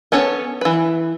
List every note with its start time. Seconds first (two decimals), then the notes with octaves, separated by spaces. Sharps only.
0.12 B3 C#4 A4 C#5
0.61 E3 B4